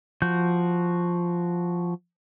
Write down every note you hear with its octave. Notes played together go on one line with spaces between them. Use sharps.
F3 F#4 G6